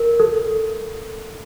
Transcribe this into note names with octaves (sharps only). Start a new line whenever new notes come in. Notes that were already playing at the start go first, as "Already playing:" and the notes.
Already playing: A#4
A4